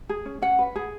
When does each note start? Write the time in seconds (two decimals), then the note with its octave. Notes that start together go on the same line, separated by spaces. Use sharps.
0.09 G#4
0.25 C#4
0.42 C#4 F#5
0.59 B4
0.76 G#4